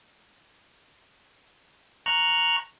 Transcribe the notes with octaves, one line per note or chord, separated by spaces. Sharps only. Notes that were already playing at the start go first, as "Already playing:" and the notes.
A#5 C#6 F6 F#6